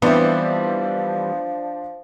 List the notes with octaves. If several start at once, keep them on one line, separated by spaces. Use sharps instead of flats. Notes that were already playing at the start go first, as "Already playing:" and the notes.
E3 F3 G3 B3 C4 D4 C5 D5